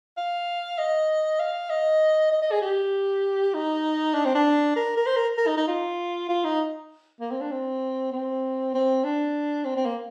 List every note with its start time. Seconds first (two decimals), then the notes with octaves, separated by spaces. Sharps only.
0.17 F5
0.78 D#5
1.39 F5
1.70 D#5
2.32 D#5
2.42 D#5
2.51 G#4
2.62 G4
3.54 D#4
4.14 D4
4.25 C4
4.35 D4
4.76 A#4
4.97 A#4
5.06 C5
5.16 A#4
5.38 A#4
5.47 D#4
5.57 D#4
5.68 F4
6.29 F4
6.45 D#4
7.20 A#3
7.31 C4
7.41 D4
7.52 C4
8.12 C4
8.74 C4
9.04 D4
9.65 C4
9.76 C4
9.85 A#3